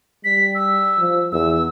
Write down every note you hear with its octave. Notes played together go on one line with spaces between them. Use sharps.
G3 B6
E6
F3
E2 E6